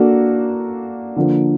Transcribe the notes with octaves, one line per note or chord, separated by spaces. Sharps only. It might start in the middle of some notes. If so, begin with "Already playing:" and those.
Already playing: A#3 D4 F#4 A4
D3 F3 A#3